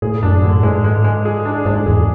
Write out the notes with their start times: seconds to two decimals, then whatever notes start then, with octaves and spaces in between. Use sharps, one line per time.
0.02 A2 G#4
0.23 F#2 D4
0.43 A2 D3
0.63 G#2 G#3
0.84 G#3
1.04 G#3
1.25 G#4
1.45 D4
1.66 G#2 D4
1.86 E2 G#4